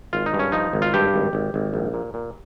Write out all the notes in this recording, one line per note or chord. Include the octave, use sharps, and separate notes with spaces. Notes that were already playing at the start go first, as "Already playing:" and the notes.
G#1 F4
D#4
G2
C#4
F3 D#4
G#1
F4
G2 G4
G#1
G#1
G#1
A#1
A#2
A#2